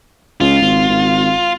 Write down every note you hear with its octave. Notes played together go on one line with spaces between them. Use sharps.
C#2 F4
G#1
G#1